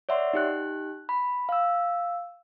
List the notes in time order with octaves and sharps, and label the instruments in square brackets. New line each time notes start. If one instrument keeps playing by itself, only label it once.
[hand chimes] C#5 D5 E5 F#5 C6
D#4 G4 F#6
B5
F5 E6